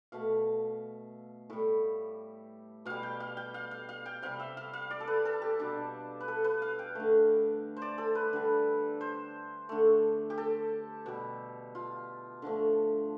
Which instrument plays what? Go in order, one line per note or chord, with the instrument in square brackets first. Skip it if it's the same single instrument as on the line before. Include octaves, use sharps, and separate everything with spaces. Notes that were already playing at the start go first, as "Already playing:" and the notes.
[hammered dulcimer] B2 A3 F5
A2 G3
B2 G3 F5
G5
F5
G5
F5
F5
F5
G5
C3 G3 F5
E5
F5
F5
D5
A4
B4
A4
G4
B2 G3 D4
B4
A4
B4
F5
G5
D3 A3
C5
D5
A4
B4
D3 G3
C5
D3 A3
G4
A4
B2 G3
F4
D3 F3 A3